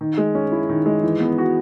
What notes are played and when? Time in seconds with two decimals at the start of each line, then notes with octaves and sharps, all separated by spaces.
0.01 D#3
0.18 G#3
0.35 C#4
0.52 E4
0.69 D#3
0.86 G#3
1.03 E3
1.20 B3
1.38 F#4